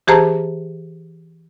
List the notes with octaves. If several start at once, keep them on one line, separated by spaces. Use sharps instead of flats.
E3 G4 G#4 C5 A5 A#5